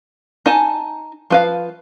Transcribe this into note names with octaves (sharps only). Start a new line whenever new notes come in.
D#4 G#5 A5
F3 B4 F5